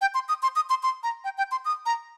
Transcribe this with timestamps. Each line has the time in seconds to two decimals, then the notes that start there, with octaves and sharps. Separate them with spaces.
0.01 G5
0.14 C6
0.29 D#6
0.43 C6
0.56 D#6
0.70 C6
0.83 C6
1.03 A#5
1.24 G5
1.38 G5
1.52 C6
1.65 D#6
1.86 A#5